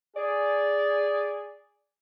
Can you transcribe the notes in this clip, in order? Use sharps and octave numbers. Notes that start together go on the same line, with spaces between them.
G#4 D5